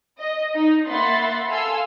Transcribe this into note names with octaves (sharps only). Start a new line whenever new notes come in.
D#5
D#4
A#3 E5 F#5 B5 C6 A6
A4 F5 G#5 A5 C6 E6